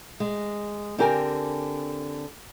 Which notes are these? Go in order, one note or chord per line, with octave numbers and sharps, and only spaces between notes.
G#3
D3 C4 G4 A#4 F#5 G#5